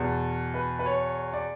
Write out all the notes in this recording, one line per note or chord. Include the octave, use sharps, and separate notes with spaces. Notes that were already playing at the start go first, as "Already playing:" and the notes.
Already playing: E2 B2
B4
B4
C#5
D5